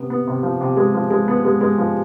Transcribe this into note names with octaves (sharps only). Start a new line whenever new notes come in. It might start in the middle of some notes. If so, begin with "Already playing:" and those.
Already playing: C3 B3
B3
C3
F3
C3
G#3
F3
G#3
B3
G#3
G#3
F3